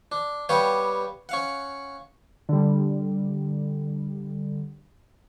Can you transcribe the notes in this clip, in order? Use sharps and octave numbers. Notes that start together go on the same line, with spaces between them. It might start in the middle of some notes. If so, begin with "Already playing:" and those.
D4
G3 B3 G4 C#5 F5 D#6
C#4 F5 F#5
D3 G3